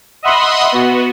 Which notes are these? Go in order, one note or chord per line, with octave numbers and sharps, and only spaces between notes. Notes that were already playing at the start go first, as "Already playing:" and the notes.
D#5 E5 F#5 B5 C6 D#6
B3 F#4